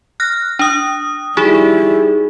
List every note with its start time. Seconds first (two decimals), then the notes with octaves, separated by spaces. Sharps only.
0.20 F6 F#6 A#6
0.59 D4 D#6
1.37 G3 D#4 E4 F#4 G#4